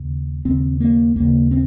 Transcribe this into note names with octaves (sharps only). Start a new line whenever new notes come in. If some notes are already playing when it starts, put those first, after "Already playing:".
Already playing: D#2 C#3
D#2 C#3 C4
A#3
D#2 C#3 A#3
C4